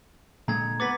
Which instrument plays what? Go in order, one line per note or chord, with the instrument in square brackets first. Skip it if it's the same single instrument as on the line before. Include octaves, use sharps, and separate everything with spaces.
[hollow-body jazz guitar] A#2 D3 G#3 [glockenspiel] A#5 G#6
[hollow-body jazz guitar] B3 B4 [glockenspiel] D6 A6 B6